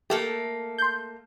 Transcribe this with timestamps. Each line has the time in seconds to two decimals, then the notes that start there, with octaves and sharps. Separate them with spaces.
0.10 A3 A#3 G4 A4
0.78 C6 G6